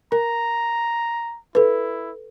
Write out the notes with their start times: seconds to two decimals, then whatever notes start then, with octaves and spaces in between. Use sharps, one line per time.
0.12 A#4 A#5
1.55 E4 A4 B4